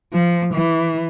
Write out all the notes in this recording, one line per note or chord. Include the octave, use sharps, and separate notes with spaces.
F3
E3